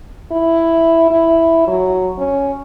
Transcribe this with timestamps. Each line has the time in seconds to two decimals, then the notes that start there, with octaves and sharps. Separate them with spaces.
0.32 E4
1.10 E4
1.67 F#3
2.18 C#4